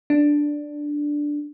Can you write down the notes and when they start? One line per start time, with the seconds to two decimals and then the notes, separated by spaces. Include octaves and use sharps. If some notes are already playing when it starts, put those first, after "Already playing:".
0.10 D4